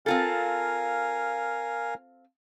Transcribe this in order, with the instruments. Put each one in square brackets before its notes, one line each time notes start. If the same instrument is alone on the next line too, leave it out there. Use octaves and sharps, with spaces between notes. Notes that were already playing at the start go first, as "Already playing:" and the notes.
[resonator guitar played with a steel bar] C4 F4 A4 [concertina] A#4 F5 G#5